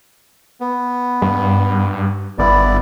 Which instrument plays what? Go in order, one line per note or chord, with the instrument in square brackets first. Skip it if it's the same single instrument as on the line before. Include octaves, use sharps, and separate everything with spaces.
[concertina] B3
[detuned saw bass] G2
[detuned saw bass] G1 [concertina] B3 E4 D5